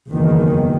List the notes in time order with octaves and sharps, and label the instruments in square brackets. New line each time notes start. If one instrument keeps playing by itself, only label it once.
[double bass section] F#1 E2 D#3